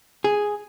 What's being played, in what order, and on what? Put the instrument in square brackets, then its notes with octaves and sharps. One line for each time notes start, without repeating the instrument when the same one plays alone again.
[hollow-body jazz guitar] G#4